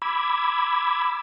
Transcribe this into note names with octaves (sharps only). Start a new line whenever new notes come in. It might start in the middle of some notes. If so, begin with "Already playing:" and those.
B5 D6 E6 G#6